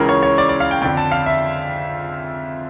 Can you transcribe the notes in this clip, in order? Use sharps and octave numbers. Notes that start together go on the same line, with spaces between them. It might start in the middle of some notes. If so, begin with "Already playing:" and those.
Already playing: C#2 C#3 E3 A#4
C#5
C#5
D5
D5
F5
G5
F2 D3 G5
A5
F5
E5